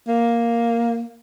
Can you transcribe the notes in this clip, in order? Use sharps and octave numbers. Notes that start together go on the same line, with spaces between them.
A#3